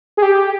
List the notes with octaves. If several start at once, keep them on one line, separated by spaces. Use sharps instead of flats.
G#4
G4